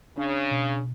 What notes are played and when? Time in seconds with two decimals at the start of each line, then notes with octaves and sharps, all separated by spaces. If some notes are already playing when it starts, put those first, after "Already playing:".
0.18 C#3 D4
0.51 B2